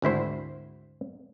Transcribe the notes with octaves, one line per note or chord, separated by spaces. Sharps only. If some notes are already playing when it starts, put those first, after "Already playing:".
G#1 D2 E4 C5